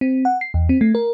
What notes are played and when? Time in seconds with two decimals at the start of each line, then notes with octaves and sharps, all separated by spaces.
0.01 C4
0.25 F#5
0.41 C7
0.54 E2
0.69 C4
0.81 A3
0.95 A#4